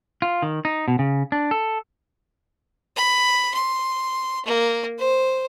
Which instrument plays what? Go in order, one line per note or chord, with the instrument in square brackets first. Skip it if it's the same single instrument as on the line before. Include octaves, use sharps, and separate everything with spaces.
[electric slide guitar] F4
D#3
D#4
B2
C#3
D4
A4
[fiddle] B5
C6
A#3
C5